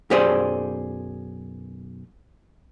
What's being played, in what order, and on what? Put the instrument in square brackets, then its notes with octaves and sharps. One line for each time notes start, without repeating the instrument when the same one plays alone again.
[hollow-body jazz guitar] B1 F#2 G4 G#4 C5 D5